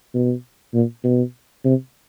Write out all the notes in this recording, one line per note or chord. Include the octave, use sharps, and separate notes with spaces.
B2
A#2
B2
C3